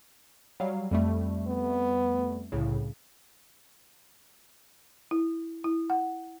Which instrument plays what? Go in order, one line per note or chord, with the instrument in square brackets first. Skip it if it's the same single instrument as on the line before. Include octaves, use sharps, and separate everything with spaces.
[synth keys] F#3 G3 F5
F2 G3 A3
[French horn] B3
[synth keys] C2 A2 C#3
[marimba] E4
E4
F#5